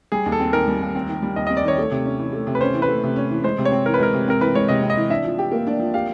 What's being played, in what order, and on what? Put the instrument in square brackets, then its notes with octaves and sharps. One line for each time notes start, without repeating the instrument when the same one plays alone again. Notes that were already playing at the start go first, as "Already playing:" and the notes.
[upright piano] G3 [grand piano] G#4
[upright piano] D#2
[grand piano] A4
[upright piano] C4
[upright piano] D#3 [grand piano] A#4
[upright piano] G3
D#2
C4
D#3
G3
[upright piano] D#2 [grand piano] D#5
[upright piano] C4 [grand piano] D#5
[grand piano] D5
[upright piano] D#3 [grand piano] C#5
[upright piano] A3
C3
C#4
E3
A3
C3
[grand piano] B4
[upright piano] C#4 [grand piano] C5
[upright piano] E3
[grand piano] B4
[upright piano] A3
C3
C#4
E3
[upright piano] G#3 [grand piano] C5
[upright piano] C3
[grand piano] C#5
[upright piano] C4
[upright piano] E3 [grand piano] A#4
[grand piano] B4
[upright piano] G#3 [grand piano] A#4
[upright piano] C3
[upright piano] C4 [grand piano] A#4
[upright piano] E3 [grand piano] B4
[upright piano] G#3 [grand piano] C#5
[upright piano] C3 [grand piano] D#5
[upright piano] C4
[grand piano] D#5
[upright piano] E3
[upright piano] D4 [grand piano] E5
[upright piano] F3
G4
A#3
D4
F3
[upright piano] G4 [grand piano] F5